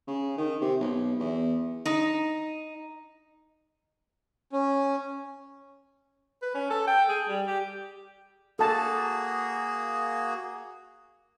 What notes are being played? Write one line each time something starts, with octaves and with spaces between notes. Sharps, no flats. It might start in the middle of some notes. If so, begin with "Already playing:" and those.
C#3
D#3
C3
B1
E2
D#4
C#4
B4
C#4
A4
G5
G#4
G3
G4
A#3 F#4 G#4 A4 A5